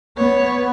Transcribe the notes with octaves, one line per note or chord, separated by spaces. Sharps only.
B3 C#5